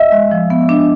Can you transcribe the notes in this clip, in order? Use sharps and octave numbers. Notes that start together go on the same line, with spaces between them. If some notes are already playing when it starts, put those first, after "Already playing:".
Already playing: D#5 E5
G#3
F3
B3
D4